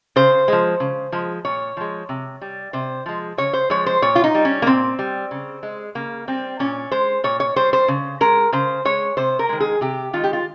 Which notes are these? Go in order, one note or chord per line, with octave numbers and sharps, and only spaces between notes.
C#3 C5
F3 G#3
C#3
F3 G#3
A#2 C#5
F3 G#3
C3
G3
C3 C5
F3 G#3
C#3 C#5
C5
F3 G#3 C#5
C5
A#2 C#5
F4
D#4
G3
C#4
A#3
A#2 C4
G3
C#3
G#3
C#3 A#3
G3 C4
A#2 C#4
G#3 C5
A#2 C#5
C#5
G3 C5
C5
C#3
G#3 A#4
C#3 C5
G#3 C#5
C3 C5
A#4
D#3 G#3
G#4
C3 G4
D#3 G#3 F4
G4
F4